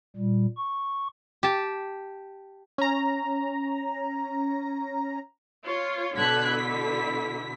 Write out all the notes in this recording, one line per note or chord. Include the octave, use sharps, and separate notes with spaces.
A#2 G3
C#6
G4 A5
C#4 A#5
F4 C#5
B2 D3 A5 F#6 G#6 B6
E4